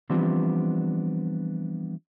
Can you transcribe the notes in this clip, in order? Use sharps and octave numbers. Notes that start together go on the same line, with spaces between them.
E3 F3 G3 B3 C4 D4